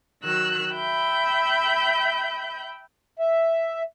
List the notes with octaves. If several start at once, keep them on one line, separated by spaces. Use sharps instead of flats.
D#3 F#3 E6 F#6
E5 G5 B5 G6
E5